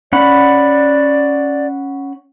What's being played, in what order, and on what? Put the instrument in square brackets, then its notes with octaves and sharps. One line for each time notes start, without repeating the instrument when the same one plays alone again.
[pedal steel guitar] C#4 F#5 B5 [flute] D5